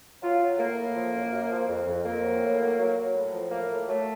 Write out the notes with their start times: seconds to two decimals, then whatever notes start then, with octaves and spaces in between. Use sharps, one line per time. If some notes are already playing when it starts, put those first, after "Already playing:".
0.22 F#3 F4
0.41 F#3
0.58 A2 A#3
0.77 A2
0.95 F3
1.14 F#2
1.32 F#2
1.50 F3
1.68 F2
1.87 F2
2.05 F2 A#3
2.23 F#3
2.41 A2
2.59 F#3
2.78 F#3
2.97 F#3
3.14 A2
3.33 F3
3.51 A2 A#3
3.69 A2
3.88 F#3 A3